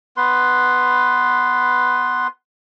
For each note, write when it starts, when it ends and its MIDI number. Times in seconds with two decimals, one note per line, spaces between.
0.17 2.27 59
0.17 2.27 71
0.17 2.27 84